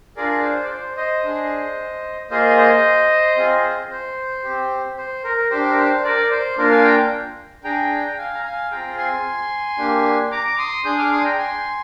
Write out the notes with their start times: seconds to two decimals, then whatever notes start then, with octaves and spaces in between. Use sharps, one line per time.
0.17 D4 F4 G#4 A#4 D5
0.44 C5
0.64 D5
0.70 C5
0.97 C5 D#5
1.24 D4 G#4
2.30 A#3 F4 G#4 C5 D#5
2.57 C5 D#5
3.37 C4 F4 G#4
3.91 C5
4.44 C4 G4
4.98 C5
5.24 A#4
5.51 D4 G4 C5
5.69 A#4
5.78 C5
6.04 A#4 D5
6.31 C5
6.57 A#3 D4 F4 A#4
6.71 F5 G#5
6.84 G5 A#5
7.64 D4 G#4 G5 A#5
8.06 G5
8.18 F5 G#5
8.34 A#5
8.44 F5 G#5
8.71 C4 F4 G#4 G5 A#5
8.98 G#5 C6
9.78 A#3 D4 G4
10.31 A#5 D6
10.47 D6
10.58 C6 D#6
10.84 D4 G#4 D#6 G6
10.98 D6 F6
11.12 C6 D#6
11.24 G5 A#5
11.38 G#5 C6